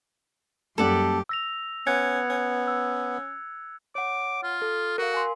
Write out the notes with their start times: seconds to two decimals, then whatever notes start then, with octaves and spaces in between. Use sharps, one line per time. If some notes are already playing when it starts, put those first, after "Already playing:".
0.78 F#2 G3 A#3 C#4 G4 A4 D5 F#5
1.29 E6 A#6 F7
1.87 B3 C#4 F#6 G#6 C#7
2.30 C#4
2.68 E6
3.95 C#5 F#5 D6
4.43 F4
4.62 A4
4.98 F#4 A#4 F5
5.14 G#5 C6